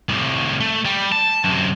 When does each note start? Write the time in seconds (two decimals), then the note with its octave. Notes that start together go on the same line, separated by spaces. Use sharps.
0.09 C2 A2
0.60 A3
0.85 G3
1.12 A5
1.44 F#2 C3